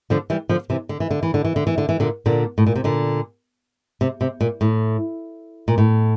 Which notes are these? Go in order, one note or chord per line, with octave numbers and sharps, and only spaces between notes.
D3 F3
E3 G3
D3 F3
C3 E3
D3
E3
D3
E3
D3
E3
D3
E3
D3
E3
A#2 D3
A#2 D3
A2
A#2
C3
A#2 D3
C3
C3
A#2
A2
A#2
A2